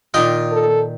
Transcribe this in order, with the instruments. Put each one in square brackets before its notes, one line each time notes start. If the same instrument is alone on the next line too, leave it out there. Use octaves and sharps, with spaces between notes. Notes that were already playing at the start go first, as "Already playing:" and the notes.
[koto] A#2 D#3 G5 [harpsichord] F4 D#5
[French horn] A4